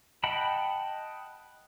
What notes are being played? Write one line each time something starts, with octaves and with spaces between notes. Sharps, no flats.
D#5 F#5 G5 A5 B5